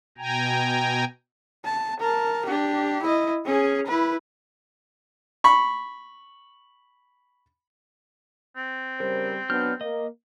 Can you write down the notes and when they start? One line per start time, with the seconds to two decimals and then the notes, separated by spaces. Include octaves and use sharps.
0.18 B2 G5 G#5 A#5
1.65 A5
2.00 A#4 A5
2.46 D4 G4
3.02 E4 D#5
3.45 C#4 G#4
3.87 E4 B4
5.44 B5 C#6
8.56 C4
9.00 C#3 G3 A#4 C5
9.50 F#3 B3 D4 F6 G6
9.81 A#3 D#5